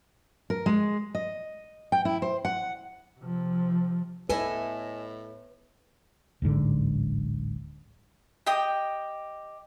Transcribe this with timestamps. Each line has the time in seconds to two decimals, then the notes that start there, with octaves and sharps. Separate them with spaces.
0.50 A#4
0.66 G#3
1.15 D#5
1.92 G5
2.05 E4
2.22 C5
2.45 F#5
3.20 C3 F3
4.29 A2 E4 A4 B4 D#5 E5 G#5
6.42 D1 A1 G#2 D3
8.46 G4 D#5 G5 D#6